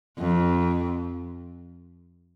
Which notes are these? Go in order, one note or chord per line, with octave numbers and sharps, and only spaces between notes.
F2